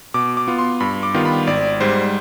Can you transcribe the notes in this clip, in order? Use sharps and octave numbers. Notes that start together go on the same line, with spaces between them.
B2 D6
D6
B3 F4
C6
G2 B5
D6
D#3 G3 B3 F4
B5
G#1 D5
G#2 G3 C5